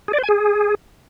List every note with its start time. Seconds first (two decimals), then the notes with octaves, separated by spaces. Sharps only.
0.08 G#4
0.13 D5
0.18 C5
0.23 G#5
0.29 G#4